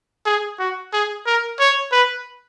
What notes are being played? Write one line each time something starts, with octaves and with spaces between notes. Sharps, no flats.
G#4
F#4
G#4
A#4
C#5
B4